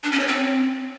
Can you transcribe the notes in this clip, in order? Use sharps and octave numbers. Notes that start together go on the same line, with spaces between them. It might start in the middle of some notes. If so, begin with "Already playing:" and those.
D4
C#4
C#5
C4